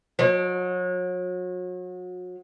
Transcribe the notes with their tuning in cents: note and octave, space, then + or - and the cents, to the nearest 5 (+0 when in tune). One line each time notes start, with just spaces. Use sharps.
F#3 -35